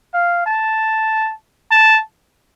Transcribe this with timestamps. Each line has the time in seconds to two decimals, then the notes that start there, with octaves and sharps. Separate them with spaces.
0.14 F5
0.46 A5
1.71 A5